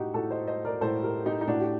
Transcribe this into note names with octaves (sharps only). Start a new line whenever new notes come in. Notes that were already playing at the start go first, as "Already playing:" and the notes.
Already playing: A2 D#4 F#4 G4
A2 F#4 A4
C5 D#5
C5 D#5
A#4 D5
A2 A4 C5
G4 A#4
D#4 G4
D#4
A2 D4 F#4
G4